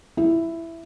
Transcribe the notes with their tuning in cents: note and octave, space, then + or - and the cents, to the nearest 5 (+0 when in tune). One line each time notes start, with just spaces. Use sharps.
E4 +5